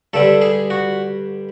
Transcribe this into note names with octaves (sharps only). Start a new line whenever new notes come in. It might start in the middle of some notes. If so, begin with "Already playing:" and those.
G2 D3 G3 A4
G#4
F#4